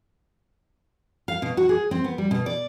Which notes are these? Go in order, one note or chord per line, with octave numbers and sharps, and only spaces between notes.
F5
B2
F#4
G#4
C4
B3
G3
B2
D5